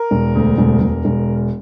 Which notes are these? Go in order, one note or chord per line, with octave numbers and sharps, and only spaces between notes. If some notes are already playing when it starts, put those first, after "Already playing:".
Already playing: A#4
E1
D2
E1
E1
E1